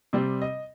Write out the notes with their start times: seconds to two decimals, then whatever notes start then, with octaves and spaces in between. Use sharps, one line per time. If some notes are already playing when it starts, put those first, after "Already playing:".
0.13 C3 G3 C4 D5
0.42 D#5